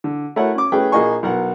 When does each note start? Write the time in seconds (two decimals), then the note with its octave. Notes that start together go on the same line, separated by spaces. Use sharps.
0.04 D3
0.36 A3 E4 F#4 A#4 C#5 F#5
0.55 C#4 D6
0.72 A3 C#4 G#4 B4 G5
0.92 A#1 A#3 G#4 D#5 G#5 C#6
1.23 B1 A#4 F#5